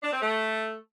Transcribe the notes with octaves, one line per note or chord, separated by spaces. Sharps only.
D4
C4
A3